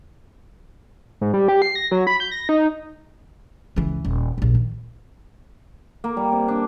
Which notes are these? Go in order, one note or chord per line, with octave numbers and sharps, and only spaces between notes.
G#2
G3
G4
C7
A#6
F#3
B5
G6
A#6
D#4
C#2 E3
D#1
A#1 D#2
D#3
A#3
G3
C3
D4